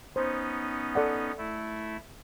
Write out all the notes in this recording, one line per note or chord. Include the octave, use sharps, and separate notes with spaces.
B3 C#4 D#4 C5
A4 D5 F#5
A3 E4